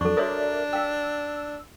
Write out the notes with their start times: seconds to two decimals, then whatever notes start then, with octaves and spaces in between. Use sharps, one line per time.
0.01 F2 F#3 D4 A4 C#6
0.17 F#4 A#4 C#5 D5 E5 D#6
0.73 F5 G5 E6